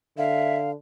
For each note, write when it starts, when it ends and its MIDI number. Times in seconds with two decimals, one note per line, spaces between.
0.18 0.75 50
0.18 0.57 76
0.18 0.70 77